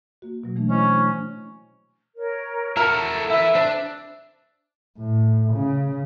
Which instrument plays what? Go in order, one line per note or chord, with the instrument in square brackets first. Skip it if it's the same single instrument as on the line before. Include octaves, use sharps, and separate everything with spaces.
[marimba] A#3 F#4
B2 F#3
E3 A3 D4
[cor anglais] C#4 [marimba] E4 C5 D#5
[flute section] A#4 C#5
[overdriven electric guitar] E4 F#4 [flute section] A4 [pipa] A#4
[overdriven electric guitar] E4 B4 [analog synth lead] E5
[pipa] C4 [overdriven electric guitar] D4
[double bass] A2
C#3